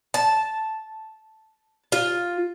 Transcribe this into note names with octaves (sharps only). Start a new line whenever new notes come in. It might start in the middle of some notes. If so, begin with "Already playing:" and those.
A5
F4